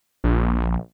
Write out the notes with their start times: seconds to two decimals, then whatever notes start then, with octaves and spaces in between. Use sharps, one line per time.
0.24 A#1